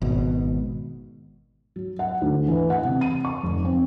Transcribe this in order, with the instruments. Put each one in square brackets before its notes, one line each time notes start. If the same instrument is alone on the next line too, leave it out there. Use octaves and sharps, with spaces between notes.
[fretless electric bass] G#1 B2
[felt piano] F#3
F#5
D2
E3
F#5
C3
D#7
C#6
F1
C4